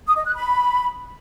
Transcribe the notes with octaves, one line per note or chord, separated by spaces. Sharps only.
D#6
D#5
F#6
B5